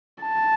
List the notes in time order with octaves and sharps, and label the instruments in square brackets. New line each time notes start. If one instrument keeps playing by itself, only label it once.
[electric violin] A5